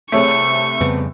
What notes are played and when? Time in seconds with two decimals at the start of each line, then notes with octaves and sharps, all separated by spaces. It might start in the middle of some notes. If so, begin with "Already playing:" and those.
0.12 C2 C3 A3 G#4 C#5 C#6 C#7
0.81 F2 C#3 G3 B3